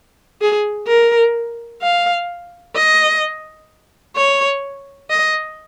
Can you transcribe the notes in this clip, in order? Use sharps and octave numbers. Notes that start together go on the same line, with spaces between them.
G#4
A#4
F5
D#5
C#5
D#5